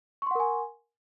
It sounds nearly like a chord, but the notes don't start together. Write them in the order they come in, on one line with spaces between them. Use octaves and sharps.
C#6 C6 F#5 A#4 G#5